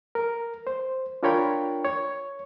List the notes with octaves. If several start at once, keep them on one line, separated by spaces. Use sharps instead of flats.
A#4
C5
D4 F4 A#4 C#5 G5 B5
C#5